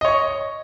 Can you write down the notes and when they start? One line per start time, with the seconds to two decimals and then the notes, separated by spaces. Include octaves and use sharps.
0.01 D#5
0.05 C#5
0.08 C#6